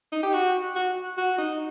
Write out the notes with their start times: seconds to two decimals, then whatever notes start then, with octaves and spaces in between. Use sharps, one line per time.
0.12 D#4
0.23 G4
0.34 F#4
0.76 F#4
1.18 F#4
1.38 D#4